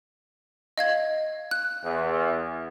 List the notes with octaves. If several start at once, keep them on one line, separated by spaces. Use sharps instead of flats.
D#5 F5 G#6
F#6
E2